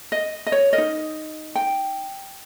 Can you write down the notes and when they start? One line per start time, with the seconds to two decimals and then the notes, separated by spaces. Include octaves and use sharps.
0.12 D#5
0.46 D#5
0.52 C#5
0.73 A#4 D#5
0.78 D#4
1.55 G5